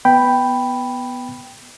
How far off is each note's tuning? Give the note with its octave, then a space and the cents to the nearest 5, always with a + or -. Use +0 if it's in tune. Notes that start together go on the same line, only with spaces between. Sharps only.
B3 +0 G5 +0 B5 +0